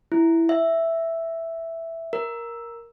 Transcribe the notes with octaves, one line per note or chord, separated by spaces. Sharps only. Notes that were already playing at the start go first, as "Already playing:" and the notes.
E4
E5
A#4